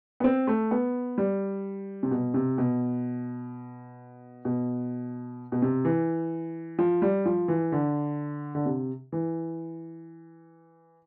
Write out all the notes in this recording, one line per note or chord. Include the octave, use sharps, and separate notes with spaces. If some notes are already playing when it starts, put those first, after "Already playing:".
B3
C4
A3
B3
G3
C3
B2
C3
B2
B2
B2
C3
E3
F3
G3
F3
E3
D3
D3
C3
E3